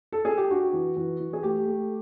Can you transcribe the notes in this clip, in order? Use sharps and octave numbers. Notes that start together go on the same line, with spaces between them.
A4
G#4
G4
D4 F#4
E3
E3
E3
G#4
A3 G4
A3